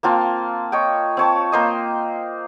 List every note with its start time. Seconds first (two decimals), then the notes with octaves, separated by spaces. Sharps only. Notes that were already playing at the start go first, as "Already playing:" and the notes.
0.03 A#3 C4 F4 A5
0.72 C#5 D#5 G5
1.17 C4 C#5 A5
1.52 A#3 C5 D#5